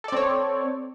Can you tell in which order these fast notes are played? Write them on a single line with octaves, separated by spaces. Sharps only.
A4 D5 C4 C#5